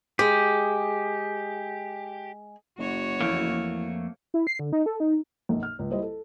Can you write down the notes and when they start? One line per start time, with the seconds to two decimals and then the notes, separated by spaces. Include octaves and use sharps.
0.19 G#3 G4
2.79 F#1 F#4 C#5
3.21 F2 E3 A3 A#3
4.34 E4
4.47 C7
4.59 D3
4.73 D#4
4.86 A4
5.00 D#4
5.49 B1 F#2
5.63 F6
5.79 C#2
5.90 G3 E4 C5 D#5
6.02 A4